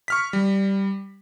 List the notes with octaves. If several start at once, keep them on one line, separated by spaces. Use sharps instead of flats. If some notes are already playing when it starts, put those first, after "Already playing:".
C#6 F6 B6
G3